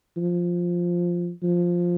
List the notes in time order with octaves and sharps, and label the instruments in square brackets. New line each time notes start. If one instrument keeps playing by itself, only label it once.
[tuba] F3
F3